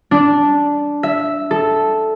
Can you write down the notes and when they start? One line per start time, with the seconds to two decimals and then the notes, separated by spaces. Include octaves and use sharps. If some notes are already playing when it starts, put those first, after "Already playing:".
0.11 D4
1.03 E5
1.51 A4